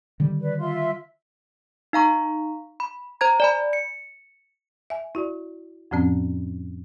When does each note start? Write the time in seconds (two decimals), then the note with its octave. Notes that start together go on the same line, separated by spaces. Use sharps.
0.20 D3 D#3 G3
0.41 B4 D5
0.60 F4 E5 C6
1.93 D#4 F5 A#5 C#6
2.80 B5
3.21 C5 A#5 G#6
3.40 D5 G#5 B5
3.73 C#7
4.90 E5 G#5
5.15 E4 F#4 D5
5.91 F2 A2 F3 C4 C#4